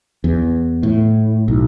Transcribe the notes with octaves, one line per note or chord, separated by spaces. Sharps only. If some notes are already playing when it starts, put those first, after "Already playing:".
E2
A2
B1